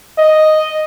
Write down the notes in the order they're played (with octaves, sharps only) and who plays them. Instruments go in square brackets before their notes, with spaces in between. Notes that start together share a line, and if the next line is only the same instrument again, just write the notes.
[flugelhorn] D#5